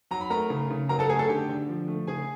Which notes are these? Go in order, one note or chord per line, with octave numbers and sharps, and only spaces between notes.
F#3 A#5
B5
A3 A#4 A#5
C#3
C#3
F#3 A#4 A#5
A4 A5
A3 G#4 G#5
A4 A5
D3 G4 G5
D3
F3
A3
C#3 G#4 G#5